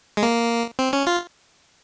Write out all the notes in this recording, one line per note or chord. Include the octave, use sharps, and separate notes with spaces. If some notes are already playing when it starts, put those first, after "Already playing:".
G#3
A#3
C4
C#4
F4